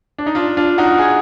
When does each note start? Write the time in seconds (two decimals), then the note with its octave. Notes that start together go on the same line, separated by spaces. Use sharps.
0.18 D4
0.26 D#4
0.35 D4 F4
0.57 D4 F4
0.78 D#4 F#4
0.99 F4 G#4